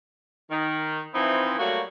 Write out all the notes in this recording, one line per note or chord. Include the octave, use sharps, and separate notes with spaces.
D#3
E3 F3 C4 D#4 E4
F#3 G3 A3 A#3 F#4